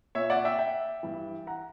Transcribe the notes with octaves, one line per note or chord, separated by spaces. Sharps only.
A#2 C#5 E5
D5 F#5
E5 G5
E5 G5
G2 E3
F#5 A#5